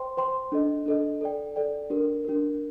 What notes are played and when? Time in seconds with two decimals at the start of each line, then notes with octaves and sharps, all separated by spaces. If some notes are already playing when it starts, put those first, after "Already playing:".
Already playing: C5 G5 C6
0.17 C5 G5 C6
0.52 D4 A4 D#5
0.86 D4 A4 D#5
1.21 A4 D5 G5
1.56 A4 D5 G5
1.90 D4 G4 A#4
2.25 D4 G4 A#4